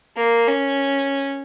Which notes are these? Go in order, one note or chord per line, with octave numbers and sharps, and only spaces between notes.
A#3
C#4